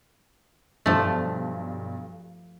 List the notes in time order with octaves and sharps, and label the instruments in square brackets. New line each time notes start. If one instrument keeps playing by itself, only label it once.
[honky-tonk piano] B1 G2 D4 [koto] F3 A3